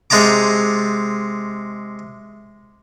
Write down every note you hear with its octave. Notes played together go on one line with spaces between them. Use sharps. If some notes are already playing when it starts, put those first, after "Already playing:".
C3 G#3 A5 A#5 D6